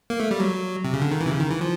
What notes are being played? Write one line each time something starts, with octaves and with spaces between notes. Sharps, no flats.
A#3
A3
G3
F#3
C3
C#3
D3
D#3
E3
C3
C#3
D#3
E3
F3